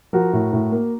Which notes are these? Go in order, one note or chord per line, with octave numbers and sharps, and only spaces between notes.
F3 F#4 A#4
A2
A2
A#3